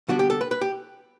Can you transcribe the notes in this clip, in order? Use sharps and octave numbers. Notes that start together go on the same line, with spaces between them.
D3 G3 B3 D4 F#4
G4
A4
B4
B4
G4